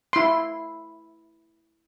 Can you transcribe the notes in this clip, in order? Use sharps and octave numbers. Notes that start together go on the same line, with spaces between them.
E4 C6